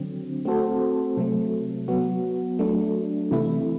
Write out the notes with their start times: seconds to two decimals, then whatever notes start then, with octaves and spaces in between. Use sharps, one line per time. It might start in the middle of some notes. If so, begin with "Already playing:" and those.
Already playing: D3 F#3 C4
0.45 A3 C4 F#4 A4 C5
1.17 C3 F#3 A3
1.88 F#3 B3 F#4
2.59 F#3 A3 D4
3.31 C3 E3 A3 E4